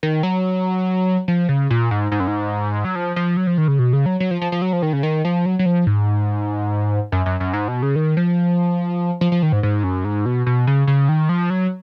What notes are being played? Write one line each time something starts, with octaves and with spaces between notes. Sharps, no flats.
D#3
F#3
F3
C#3
A#2
G#2
G#2
F#2
G#2
F#3
F3
F3
F#3
F3
D#3
C#3
B2
C#3
F#3
F#3
F3
F3
F3
F#3
F3
D#3
C#3
D#3
F3
F#3
F#3
F3
G#2
F#2
F#2
F#2
G#2
B2
C#3
D#3
F3
F3
F3
D#3
G#2
G#2
F#2
G#2
B2
B2
C#3
C#3
D#3
F3
F#3